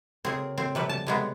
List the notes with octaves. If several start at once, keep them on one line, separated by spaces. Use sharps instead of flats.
C#3 A#3 C4 F#4 G#4
C4
C3 F3 G3 B4
A5
C3 G#3 B3 C6